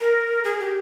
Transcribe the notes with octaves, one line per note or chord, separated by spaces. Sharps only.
A#4
G#4
G4